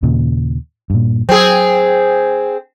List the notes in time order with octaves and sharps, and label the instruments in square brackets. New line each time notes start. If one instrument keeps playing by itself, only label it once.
[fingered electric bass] D#2 A#2 C#3
G2 A#2
[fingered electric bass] F#3 [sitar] C4 G#4